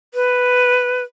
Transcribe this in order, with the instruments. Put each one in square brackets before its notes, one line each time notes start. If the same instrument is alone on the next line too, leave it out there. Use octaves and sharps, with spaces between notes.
[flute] B4